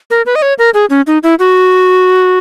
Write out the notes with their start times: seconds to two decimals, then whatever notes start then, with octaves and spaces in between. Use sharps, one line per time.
0.10 A#4
0.26 B4
0.35 D#5
0.42 C#5
0.59 A#4
0.74 G#4
0.90 C#4
1.07 D#4
1.23 E4
1.39 F#4